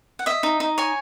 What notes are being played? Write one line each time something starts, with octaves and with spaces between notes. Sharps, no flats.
F#5
D#5 E5
D#4
D#4
C#5 G#5